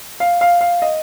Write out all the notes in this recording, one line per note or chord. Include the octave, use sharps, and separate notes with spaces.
F5
F5
F5
D#5